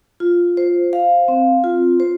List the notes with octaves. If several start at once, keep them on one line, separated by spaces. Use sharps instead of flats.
F4
C5
F5
C4
F4
C5